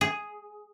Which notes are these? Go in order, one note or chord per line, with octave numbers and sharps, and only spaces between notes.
G#4